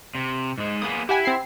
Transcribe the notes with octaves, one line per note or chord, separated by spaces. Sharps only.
C3
G#2 G#3
A#3 B3 G#4 D#6
E4 G4 F#5 G#5
C4 C7